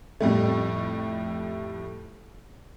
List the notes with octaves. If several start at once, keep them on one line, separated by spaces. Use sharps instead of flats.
F2 A2 G3 A3